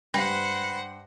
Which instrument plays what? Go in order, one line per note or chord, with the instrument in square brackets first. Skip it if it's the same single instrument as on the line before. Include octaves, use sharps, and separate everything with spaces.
[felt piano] G2 G5 A#6 [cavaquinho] B4 [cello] C5 F#5